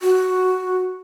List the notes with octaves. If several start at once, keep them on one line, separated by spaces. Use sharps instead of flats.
F#4